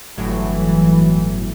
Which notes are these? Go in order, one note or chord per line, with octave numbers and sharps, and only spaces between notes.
G1 A2 E3 F#3